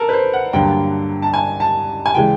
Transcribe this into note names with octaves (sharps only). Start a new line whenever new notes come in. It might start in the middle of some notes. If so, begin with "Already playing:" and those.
Already playing: A4 A#4
B4
C5
F#5
G2 D3 F#3 A#3 G5
A5
G#5
A5
G#5
C#3 E3 G#3 G5